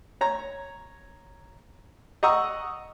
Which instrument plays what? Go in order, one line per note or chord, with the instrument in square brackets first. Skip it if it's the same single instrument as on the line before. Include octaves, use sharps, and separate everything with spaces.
[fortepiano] C#5 A#5
D#5 F#5 A#5 C#6 D#6 E6